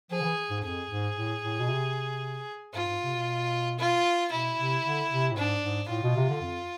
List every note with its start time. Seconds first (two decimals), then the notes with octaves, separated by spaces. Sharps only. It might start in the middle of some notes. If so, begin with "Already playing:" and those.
0.11 F3 G#4
0.21 D3
0.25 E3
0.50 G#2
0.64 F2 G#4
0.90 G#2
1.16 A2
1.42 A2
1.60 B2
1.69 C3
2.74 G#2 F4
2.88 G#2
3.03 C3
3.14 B2
3.79 F4
4.32 B2 E4
4.58 C3
4.85 D3
5.10 C3
5.31 A2
5.36 G#2 D4
5.63 G#2
5.89 A2 F4
6.03 B2
6.16 C3
6.29 D3
6.42 F2